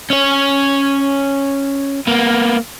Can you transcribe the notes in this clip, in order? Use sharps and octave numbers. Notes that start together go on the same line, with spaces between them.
C#4 C#5
A#3 B3